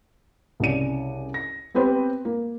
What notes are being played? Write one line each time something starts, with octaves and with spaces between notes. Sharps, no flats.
C2 C#3 D5 D#7
A#6
B3 C4 G4 B4 C5
A#3